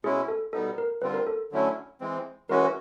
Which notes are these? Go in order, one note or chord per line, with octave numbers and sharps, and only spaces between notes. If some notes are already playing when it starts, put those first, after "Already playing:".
B2 G#3 C#4 E4 G#4
A4
B2 G3 B3 D#4 A4
A#4
D3 G3 C4 F4 B4
A#4
A4
D3 F#3 A3 C#4 E4
E3 G#3 C4
E3 G#3 C#4 F#4 A#4
B4